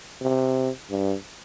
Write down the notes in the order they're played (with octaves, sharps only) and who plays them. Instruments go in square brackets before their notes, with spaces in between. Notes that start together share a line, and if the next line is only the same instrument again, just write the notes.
[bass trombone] C3
G2